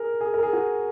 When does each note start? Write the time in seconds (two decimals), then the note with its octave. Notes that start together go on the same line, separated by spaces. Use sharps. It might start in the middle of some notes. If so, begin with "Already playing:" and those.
Already playing: G#4 A#4
0.21 G#4
0.34 A#4
0.43 G#4
0.53 F#4